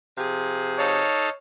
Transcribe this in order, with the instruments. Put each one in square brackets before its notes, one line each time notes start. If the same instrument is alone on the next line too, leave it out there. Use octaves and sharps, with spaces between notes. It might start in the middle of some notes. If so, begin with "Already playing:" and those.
[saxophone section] C3 F3 G#4
[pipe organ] D#4 A4 F5 [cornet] C#5